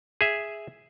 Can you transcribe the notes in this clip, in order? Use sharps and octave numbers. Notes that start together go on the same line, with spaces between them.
G#4 E5